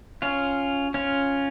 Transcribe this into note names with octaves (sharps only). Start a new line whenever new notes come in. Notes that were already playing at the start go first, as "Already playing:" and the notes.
C#4 F4
C#4 F4